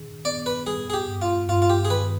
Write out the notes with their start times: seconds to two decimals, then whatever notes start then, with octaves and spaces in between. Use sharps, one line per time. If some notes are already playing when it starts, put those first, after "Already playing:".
Already playing: D#3 D4 G#4
0.25 B3 D5
0.46 B4
0.67 G3 G#4
0.90 G#4
0.94 G4
1.08 G2
1.22 F4
1.49 G2 F4
1.62 F4
1.70 G4
1.85 G#4
1.90 D#3 B4